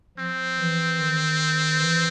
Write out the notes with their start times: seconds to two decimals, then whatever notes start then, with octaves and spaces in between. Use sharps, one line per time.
0.18 F3 C4
0.59 E3
0.98 D#3
1.79 E3